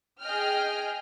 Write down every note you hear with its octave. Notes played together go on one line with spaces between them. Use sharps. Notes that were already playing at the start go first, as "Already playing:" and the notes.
G#4 D#5 G5 F6